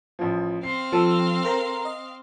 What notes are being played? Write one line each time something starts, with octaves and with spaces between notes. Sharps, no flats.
A1 F3
C4 F5 C7
F3 A4 E6
A#4 C5 A#5
D#5